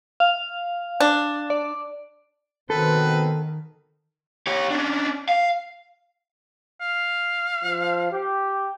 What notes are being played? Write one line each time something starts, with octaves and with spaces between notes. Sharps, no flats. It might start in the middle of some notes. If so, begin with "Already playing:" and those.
F5
D4
D5
B2 D#3 B3 C4 A4 B4
G4 C#5
C#4 D4
F5
F5
F3
G4